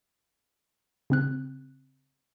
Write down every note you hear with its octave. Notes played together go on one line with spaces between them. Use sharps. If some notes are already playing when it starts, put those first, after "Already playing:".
C#3 C4 F#6